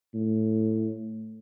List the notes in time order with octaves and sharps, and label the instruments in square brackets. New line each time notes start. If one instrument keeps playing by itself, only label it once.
[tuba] A2